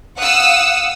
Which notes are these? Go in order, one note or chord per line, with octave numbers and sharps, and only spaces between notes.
F5 F#5 D#6 E6